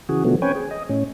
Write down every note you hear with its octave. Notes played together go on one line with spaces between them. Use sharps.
C#3 E3 F#4 G#4
B2 D3 F3 F#3 A3 B3
C4 C#4 B4 C#5 G5 G#5
G#4
D#5
A2 C#4